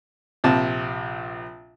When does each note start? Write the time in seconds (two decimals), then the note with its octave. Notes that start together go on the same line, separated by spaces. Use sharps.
0.44 A#1 C3 A5